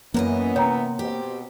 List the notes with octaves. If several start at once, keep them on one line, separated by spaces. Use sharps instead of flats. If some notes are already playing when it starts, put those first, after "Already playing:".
F#2 E3 A#3 B3 C#4 A#4 D#5
C3 C#5 G5 A#5
B2 C4 G4